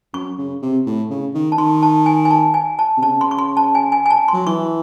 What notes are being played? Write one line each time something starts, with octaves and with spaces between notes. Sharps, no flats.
F#2 C#6
C#3
C3
A2
C#3
D#3
A5
D#3 C6
A5
G#5
G#5
A5
G#5
A5
C3
C#3 A5
C6
C#6
C6
A5
G#5
G#5
G#5
A5
F#3 C6
E3 C#6